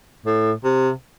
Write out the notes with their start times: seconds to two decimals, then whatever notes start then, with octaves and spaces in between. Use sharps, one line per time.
0.26 A2
0.64 C3